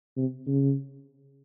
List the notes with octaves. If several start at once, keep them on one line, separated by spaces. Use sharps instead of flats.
C3
C#3